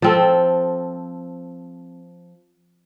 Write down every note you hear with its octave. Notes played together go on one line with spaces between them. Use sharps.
F3 C4 A4